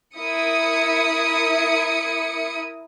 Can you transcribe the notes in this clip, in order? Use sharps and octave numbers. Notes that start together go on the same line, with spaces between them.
E4 A#4 D#6 C#7